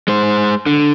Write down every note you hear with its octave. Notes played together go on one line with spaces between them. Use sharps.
G#3 C5
D3